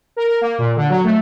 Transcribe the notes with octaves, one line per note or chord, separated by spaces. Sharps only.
A#4
A#4
A#3
A#2
D3
F#3
A3